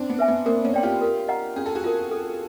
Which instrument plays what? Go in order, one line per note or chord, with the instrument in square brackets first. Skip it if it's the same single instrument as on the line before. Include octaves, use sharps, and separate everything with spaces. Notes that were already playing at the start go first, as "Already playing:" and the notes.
Already playing: [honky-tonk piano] C4 D4
B3
[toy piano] B4 E5 G#5
[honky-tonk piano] B3
[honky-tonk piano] A#3 C4 [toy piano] A#4
[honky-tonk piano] B3 C#4
[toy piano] D5 G5 C6
[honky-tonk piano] F4 G4
[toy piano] A#4
D#5 F#5 A#5
[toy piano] C#4 [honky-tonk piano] G#4
[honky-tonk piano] A4
F#4 G#4
[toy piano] F4 A#4
A4